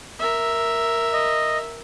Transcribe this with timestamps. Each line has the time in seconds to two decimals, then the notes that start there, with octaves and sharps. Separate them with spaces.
0.19 A#4 E5
1.13 D#5